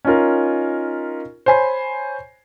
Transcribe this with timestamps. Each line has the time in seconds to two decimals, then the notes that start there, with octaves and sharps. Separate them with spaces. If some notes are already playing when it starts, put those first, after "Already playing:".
0.05 C#4 D#4 F4 A#4
1.46 C5 C#5 G#5 B5 C7